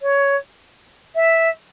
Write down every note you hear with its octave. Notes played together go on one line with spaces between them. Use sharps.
C#5
E5